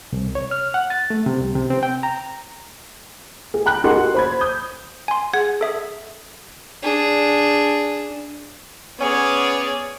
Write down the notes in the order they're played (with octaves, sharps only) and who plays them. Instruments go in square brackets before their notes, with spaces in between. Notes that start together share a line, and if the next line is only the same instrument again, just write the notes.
[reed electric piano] C2
C#5
F6
F#5
A6
A3
C3
C2
C3
C4
G5
A#5
[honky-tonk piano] G#4
G5 A#5 B5 F#6
D#4 G4 G#4 A#4 F#5 C6
F#4 A4
C5 B5 G#6
D#6 G6
[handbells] G#5 C6
[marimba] G#4 [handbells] F#5
[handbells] A4 E5 D#6
[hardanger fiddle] D4 G#4
[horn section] B3 C#4 C#5 [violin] G#4 D5